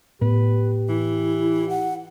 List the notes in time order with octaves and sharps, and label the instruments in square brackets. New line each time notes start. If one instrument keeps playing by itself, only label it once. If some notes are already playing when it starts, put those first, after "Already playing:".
[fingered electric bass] A2 B3 [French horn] G4 [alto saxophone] B4
[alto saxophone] E3 [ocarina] E4
[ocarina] F#5